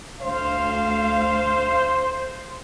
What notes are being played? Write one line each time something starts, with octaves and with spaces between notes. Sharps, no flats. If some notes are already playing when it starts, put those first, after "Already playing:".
D2 C5 F5